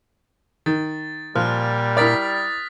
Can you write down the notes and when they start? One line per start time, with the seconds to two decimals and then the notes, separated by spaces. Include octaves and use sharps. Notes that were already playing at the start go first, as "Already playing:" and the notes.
0.66 D#3 A6
1.35 A#2 F3 G3 F6 F#6
1.97 E4 A#4 D5 D#6 A6 B6